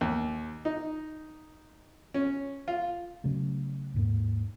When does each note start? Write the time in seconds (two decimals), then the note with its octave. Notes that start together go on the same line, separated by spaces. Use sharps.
0.01 D#2
0.65 D#4
2.14 C#4
2.68 F4
3.24 C#3 F#3 A3
3.94 D#2 G#2 A#3